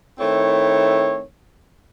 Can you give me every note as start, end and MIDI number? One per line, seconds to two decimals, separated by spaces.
0.19 1.23 51
0.19 1.23 57
0.19 1.23 60
0.19 1.23 64
0.19 1.23 73